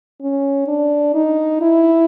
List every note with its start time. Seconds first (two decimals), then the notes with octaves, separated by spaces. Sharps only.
0.22 C#4
0.68 D4
1.14 D#4
1.62 E4